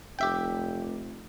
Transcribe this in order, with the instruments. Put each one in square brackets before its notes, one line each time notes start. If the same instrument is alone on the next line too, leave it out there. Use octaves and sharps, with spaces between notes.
[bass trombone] F1 [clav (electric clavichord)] G4 E5 G5